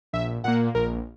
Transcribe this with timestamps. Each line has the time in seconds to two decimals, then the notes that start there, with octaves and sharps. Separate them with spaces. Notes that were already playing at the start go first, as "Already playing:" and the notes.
0.13 A#1 E5
0.44 A#2 A#3 F#5
0.75 A#1 A#4